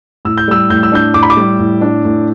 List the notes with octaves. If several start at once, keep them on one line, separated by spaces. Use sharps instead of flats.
A2 E6
G6
G3 E6
A2 G6
E6
D4 G6
A2 D6
B5
D6
G3
A2
D4
A2